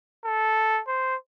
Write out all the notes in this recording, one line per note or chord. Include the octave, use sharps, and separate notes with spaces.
A4
C5